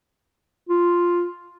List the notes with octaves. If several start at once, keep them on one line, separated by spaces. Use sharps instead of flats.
F4